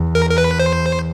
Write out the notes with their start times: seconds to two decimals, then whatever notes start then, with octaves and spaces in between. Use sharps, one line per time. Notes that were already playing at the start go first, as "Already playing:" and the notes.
Already playing: E2
0.15 A#4
0.30 A#4
0.38 B4
0.59 C5